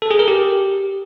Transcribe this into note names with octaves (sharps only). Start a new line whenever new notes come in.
A4
G#4
A#4
G4